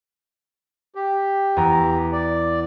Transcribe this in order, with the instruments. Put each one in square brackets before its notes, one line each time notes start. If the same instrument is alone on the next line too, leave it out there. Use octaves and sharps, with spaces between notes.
[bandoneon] G4
[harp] E2 A#5 A#6
[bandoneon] D5